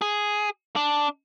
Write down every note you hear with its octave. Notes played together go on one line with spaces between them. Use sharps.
G#4
D4